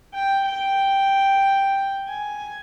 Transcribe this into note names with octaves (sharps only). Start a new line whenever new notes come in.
G5
G5
G#5